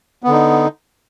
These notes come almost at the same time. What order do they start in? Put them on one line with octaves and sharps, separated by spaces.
B3 D3 D#4